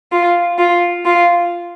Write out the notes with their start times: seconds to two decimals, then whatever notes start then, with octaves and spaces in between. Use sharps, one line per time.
0.12 F4
0.58 F4
1.05 F4